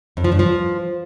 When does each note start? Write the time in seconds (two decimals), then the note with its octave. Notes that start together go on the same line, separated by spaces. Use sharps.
0.17 F2
0.24 F3
0.32 G2
0.39 F3